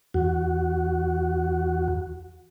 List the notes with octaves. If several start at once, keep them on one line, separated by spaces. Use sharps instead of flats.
E2 F#4